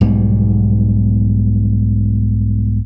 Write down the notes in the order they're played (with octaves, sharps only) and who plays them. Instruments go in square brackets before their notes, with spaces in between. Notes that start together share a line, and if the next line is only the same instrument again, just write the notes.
[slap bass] B1 G#2 B2 G3